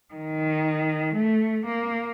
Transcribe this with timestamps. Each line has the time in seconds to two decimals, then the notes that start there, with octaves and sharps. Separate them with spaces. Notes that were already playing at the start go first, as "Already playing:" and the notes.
0.14 D#3
1.15 A3
1.66 A#3